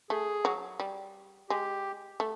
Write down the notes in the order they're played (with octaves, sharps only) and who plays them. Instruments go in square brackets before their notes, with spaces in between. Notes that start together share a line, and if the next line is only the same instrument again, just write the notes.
[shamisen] A3 [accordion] G#4
[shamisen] F#3
G3
[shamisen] G#3 [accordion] G4
[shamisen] A3